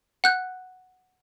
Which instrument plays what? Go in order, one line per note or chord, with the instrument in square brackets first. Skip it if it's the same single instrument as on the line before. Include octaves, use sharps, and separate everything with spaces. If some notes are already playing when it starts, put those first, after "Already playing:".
[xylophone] F#5 F#6 G6